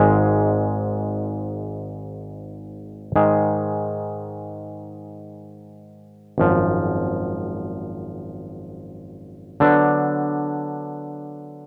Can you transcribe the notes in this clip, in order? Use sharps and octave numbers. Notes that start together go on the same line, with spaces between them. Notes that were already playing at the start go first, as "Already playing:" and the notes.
Already playing: G#1 G#2 D#3 G#3
G#2 D#3 G#3 D#4 G#4
G#1 F#2 F3
D3 F#3 B3 D4